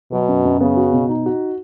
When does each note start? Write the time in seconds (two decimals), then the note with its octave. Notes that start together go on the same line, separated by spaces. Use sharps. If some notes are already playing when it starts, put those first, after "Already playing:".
0.12 B2 F#3
0.28 F#2
0.45 F#2
0.60 C#3 B3
0.77 F#4
0.93 B2
1.09 D#4
1.26 F#4